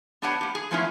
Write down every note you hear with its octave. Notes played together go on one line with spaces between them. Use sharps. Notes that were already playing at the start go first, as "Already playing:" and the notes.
B3 D4 G4 B4 C#5 F#5
A#3 G4
G#4
F3 A3 B3 C#4 E4 F4